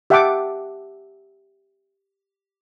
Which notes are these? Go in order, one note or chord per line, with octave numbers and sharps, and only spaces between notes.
G4 E5 F#5 G5 A5 D6